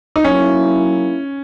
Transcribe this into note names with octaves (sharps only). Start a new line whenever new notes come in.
D#4
F#3 A#3 C#4 E4